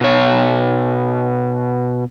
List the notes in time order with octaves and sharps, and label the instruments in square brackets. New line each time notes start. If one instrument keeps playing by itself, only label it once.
[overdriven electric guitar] B2 C#5